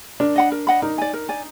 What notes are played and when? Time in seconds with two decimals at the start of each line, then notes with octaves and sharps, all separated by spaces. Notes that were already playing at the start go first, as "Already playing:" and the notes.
0.20 D4 A#4
0.36 D#5 F#5 B5
0.52 A#4
0.67 D#5 F#5 B5
0.82 D#4 A#4
0.98 D5 G#5
1.13 A#4
1.29 D5 G#5